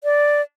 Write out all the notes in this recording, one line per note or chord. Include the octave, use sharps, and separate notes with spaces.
D5